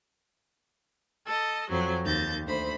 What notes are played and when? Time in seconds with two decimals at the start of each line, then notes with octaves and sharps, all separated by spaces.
1.26 A4 D#5
1.70 F2 F#3 C5
2.04 D#2 G6 A6
2.46 D2 C5 B5